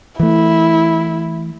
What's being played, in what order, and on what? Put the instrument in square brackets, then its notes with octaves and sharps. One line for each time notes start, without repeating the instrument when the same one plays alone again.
[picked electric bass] E3 A3 [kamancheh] E4